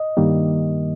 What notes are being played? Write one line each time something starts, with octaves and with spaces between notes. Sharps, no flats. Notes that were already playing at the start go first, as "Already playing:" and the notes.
Already playing: D#5
G2 D#3 G3 A#3